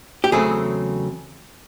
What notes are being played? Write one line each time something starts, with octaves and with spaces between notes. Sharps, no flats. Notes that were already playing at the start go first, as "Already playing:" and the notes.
G4
E2 C#3 F#3 A3 C4 G#4